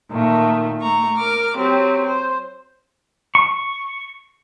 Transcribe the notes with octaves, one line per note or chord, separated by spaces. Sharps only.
A#2 D#3 A3
A3 A#5 C#6
A#4 D6 F6
F#3 C4 G4
C5
C#6